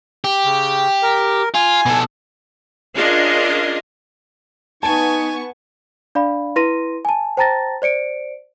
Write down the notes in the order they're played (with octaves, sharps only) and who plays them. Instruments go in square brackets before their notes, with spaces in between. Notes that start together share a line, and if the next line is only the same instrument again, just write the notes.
[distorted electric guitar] G4
[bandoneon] C#3
A#4
[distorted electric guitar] F4 [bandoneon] G#5
[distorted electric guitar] B2 A4
[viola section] C#4 D4 F4 G#4 A#4 D#5
[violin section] B3 C#6 [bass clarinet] D#4 [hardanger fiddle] G#5 [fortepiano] A5
[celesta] D4 D5 F5 B5
E4 B4 C6 A#6 D#7
G#5 A5
C5 G5 A5 A#5 A6 A#6
C5 D5 C#7 D7